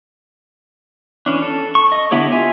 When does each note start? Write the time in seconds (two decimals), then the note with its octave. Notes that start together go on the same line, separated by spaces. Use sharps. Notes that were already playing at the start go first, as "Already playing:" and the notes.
1.26 E3 C#4 D4
1.42 A4
1.75 C#6
1.92 D#5
2.11 D3 B3 E4 G4 C#5
2.32 F4 C#5 E5 G#5